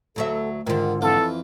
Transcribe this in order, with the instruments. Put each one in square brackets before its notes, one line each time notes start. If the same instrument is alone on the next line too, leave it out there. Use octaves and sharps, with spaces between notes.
[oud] D2 F#3 E5 [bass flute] A4
[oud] G#2 D3 [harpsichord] D#3 [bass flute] F4
[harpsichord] F2 F4 D6 [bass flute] E3 [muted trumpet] A4